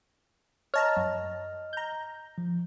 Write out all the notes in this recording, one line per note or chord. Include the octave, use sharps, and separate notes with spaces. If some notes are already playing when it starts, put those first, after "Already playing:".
C#5 D#5 A5 A#5 F6
F#2
A#5 G6
F3